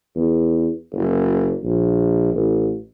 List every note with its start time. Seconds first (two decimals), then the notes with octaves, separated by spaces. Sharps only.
0.16 E2
0.93 F#1
1.63 A#1
2.34 A1